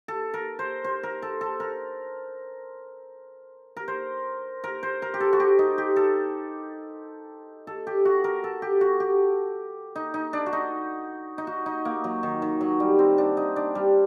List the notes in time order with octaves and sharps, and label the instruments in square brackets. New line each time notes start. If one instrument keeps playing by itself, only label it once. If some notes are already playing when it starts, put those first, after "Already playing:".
[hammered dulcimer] A4
A#4
C5
C5
A#4
A4
A4
A#4
A#4
C5
A#4
C5
A#4
G4
A4
F#4
G4
D#4
G4
A4
A4
G4
F#4
A#4
A4
G4
F#4
G4
D#4
D#4
D4
F#4
D#4
D#4
F#4
D#4
A#3
F#3
D#3
D#3
F#3
G3
C4
D4
D#4
D4
G3